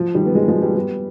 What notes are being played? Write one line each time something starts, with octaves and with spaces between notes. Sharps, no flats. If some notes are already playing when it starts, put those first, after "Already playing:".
Already playing: F3
D#3 G3
B3
F3 G#3
F3 G#3
G3 B3
G3 B3